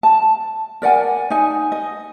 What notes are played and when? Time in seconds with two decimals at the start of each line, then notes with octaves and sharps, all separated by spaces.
0.03 A5
0.82 A#4 D5 F#5 G#5
1.30 D#4 G#5
1.72 D#5